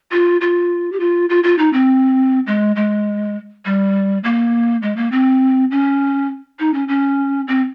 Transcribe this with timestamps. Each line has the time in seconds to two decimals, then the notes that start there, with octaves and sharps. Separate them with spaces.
0.12 F4
0.41 F4
0.92 G4
1.00 F4
1.30 F4
1.44 F4
1.58 D#4
1.73 C4
2.47 G#3
2.76 G#3
3.65 G3
4.24 A#3
4.82 G#3
4.97 A#3
5.12 C4
5.71 C#4
6.60 D#4
6.74 C#4
6.88 C#4
7.48 C4